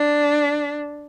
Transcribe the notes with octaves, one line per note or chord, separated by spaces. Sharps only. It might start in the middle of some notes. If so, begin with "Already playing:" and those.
Already playing: D4